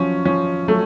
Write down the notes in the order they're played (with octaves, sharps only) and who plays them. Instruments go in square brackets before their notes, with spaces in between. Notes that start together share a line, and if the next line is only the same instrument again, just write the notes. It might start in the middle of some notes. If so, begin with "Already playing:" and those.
Already playing: [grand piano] F3 F#3 [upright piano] C#4
[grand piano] F3 [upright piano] C#4
[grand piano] F#3 [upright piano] A3